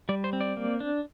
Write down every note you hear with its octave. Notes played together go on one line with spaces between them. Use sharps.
G3 D5
C5
C4
D5
A#3
D4